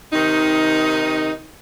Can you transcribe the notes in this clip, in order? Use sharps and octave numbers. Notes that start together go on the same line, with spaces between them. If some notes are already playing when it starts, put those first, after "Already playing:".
C3 D#3 D#4